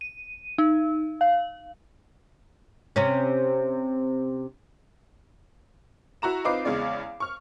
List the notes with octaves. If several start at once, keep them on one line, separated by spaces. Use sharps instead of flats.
D#7
D#4
F5
C3 C#4
E4 F#4 A#5 E7
C4 D#4 F4 B4 D6 C7
E2 C#3 G#3 D5
C#6 F6